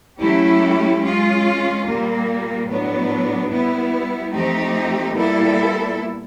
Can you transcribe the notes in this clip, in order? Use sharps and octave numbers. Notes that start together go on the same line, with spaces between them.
F#3 A3 C#4 E4 G4
G#3 C#4 F4
A#2 G3 A#3
A2 F#3 B3 D4
G3 B3 E4
F3 A3 C4 D#4 G4
A#2 G3 B3 E4 A4